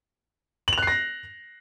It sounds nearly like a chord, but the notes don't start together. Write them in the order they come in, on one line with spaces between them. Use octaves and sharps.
F#7 F7 F#6 C7 A#6